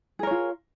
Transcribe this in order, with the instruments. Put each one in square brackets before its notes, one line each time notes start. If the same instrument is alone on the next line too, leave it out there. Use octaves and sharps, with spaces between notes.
[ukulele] G#4
A#4
C#5
F4